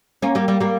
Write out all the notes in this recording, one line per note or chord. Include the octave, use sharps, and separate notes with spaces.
A#3 C#4
G3 A#3
G3 A#3
G3 A#3